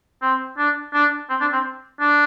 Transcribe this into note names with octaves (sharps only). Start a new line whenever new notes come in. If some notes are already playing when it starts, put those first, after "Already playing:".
C4
D4
D4
C4
D4
C4
D4